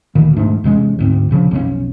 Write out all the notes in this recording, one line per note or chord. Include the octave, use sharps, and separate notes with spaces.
D2 A#2 D#3
E1 G#2 A3 D4
E2 C3 G#3 C#4
D2 G#2 C4
A#2 C#3 F3 D4
B1 F2 F#3 C#4